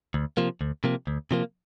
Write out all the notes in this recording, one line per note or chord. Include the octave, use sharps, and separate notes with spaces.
D2
C3 F3 A#3
D2
C3 F3 A#3
D2
C3 F3 A#3